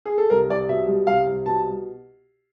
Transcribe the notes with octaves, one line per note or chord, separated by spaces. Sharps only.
G#4
A4
C2 A#4
C2 D5
B2 E5
G3
C2 F5
C2
B2 A5